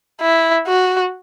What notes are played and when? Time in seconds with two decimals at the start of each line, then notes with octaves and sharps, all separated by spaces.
0.21 E4
0.67 F#4